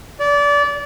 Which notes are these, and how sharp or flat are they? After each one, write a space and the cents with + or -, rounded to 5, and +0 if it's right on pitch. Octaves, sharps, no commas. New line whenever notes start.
D5 -25